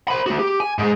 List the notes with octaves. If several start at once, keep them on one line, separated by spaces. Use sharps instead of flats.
C5 B5
A3 F#4
G4
G#5
G#2 G#3